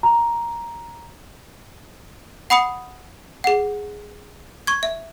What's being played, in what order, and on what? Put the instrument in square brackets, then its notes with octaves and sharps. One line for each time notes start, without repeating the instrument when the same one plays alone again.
[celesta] A#5
[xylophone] F#5 B5 D#6 C#7
G#4 F#5
C#6 G#6
E5